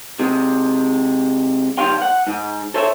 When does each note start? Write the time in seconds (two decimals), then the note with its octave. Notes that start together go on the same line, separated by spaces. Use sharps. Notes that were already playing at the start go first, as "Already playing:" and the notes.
0.19 C3 G#3
1.78 G2 D#3 D4 G4 F5 C6
2.02 F#5
2.27 G#2
2.74 A4 C5 C#5 E5